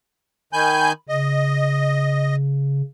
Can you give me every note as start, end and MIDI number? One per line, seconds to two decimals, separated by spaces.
0.53 0.92 51
0.53 0.92 80
0.53 0.89 83
0.53 0.92 91
1.09 2.82 49
1.09 2.36 75